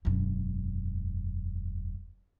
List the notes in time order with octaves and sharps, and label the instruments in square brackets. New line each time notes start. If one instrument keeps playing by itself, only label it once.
[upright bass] E1 F#2